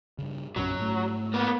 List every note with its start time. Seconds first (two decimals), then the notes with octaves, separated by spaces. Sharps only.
0.18 G2 C#3
0.56 A#1 F#2 F#3 C#4
0.78 G#2 A3
1.34 A#3 B3